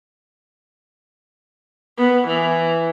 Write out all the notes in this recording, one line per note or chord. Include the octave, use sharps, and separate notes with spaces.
B3
E3